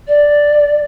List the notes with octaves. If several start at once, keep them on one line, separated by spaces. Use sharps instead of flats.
D5